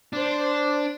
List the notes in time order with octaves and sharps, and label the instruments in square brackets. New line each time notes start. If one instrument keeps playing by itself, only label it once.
[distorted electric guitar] D4 [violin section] C5